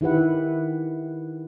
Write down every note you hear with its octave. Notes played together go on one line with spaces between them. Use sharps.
D#3 E4 G4 B4 F#5